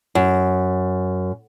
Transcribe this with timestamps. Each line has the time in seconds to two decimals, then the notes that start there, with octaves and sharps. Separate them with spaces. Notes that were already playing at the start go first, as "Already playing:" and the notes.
0.15 F#2